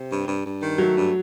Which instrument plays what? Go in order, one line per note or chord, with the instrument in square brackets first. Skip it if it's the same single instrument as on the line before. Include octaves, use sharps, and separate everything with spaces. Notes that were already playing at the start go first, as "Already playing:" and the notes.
Already playing: [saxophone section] C3
G2
G2
G2
D#3
[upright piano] F#3 [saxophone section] A3
[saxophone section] G2